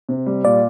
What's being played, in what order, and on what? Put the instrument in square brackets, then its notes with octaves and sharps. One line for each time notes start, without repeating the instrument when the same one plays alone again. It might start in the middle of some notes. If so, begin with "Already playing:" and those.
[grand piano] C3
G3
[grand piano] A#2 [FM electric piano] D5